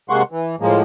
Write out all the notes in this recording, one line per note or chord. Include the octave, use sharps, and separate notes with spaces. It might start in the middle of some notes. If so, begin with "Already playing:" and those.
C3 G#3 A#3 F#5 C6 C#6
E3
A2 F3 G#3 A#3